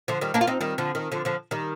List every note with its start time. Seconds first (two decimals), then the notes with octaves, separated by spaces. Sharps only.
0.08 D3 F3
0.21 D#3 G3
0.34 A#3 D4
0.41 F4
0.47 C4 D#4
0.61 D#3 G3
0.78 D3 F3
0.95 D#3
1.12 D3 F3
1.25 D3 F3
1.51 D#3 G3